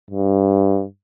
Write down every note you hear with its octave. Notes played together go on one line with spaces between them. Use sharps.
G2